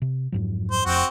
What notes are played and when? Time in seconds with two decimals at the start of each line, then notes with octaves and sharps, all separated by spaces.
0.02 C3
0.32 F2 G#2 F#3
0.71 C5
0.86 F1 F2 C4 F#4